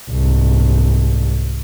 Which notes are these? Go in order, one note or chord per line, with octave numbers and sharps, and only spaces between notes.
C2 G#2